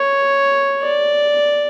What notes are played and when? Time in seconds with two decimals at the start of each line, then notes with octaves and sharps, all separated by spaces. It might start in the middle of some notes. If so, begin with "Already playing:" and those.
Already playing: C#5
0.82 D5